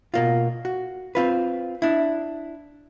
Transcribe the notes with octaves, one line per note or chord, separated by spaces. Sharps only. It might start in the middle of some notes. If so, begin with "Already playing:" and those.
B2 A#3 F4
F#4
C4 F4 B4
D4 E4